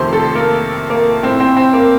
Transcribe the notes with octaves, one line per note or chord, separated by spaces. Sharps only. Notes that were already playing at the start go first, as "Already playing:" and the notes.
Already playing: F2 C3 D#3 A3 C5 C6
A4 A5
A#3 A#4
A#3 A#4
A2 A3 C4 C5
C4 C5
C4 C5
A#3 A#4